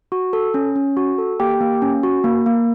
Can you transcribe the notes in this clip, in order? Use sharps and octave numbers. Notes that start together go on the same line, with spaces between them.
F#4
A4
C#4
C#4
F#4
A4
A#3 G4 G5
A#3
C#4
F#4
A#3
A#3